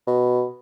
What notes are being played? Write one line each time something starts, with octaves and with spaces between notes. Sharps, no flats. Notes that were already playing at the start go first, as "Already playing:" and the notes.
B2